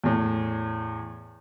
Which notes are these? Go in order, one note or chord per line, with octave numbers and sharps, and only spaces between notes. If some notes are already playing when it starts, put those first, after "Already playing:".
E2 A2